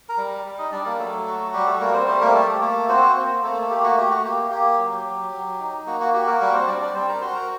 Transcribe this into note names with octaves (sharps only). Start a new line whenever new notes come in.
A#4 A#5
G3
G3
D#4 D#5
G3 D4 D5
A#3 A#4
F#3 A3 A4
F#4
G3 G4
A3 A4
G3 A#3 A#4
C4 C5
A3 C4 C5
A#3 A#4
A3 A4
G4
A3 A#3 A4
C4 F#4 C5
A#3 C4 C5
A3 A#3 A4
A4
A3 G4
F#4
A3 G4
F#4
A#3 G4
A#3 G4
F#3
F#3
F#3
D#4
A#3 F#4
F#4
F#4 G4
A#3 A#4
G3 A#3 A#4
C4 C5
G3 D4 D5
D4 D5
G3 C4 C5
A#4 A#5
F#4 C5 C6
A#4 A#5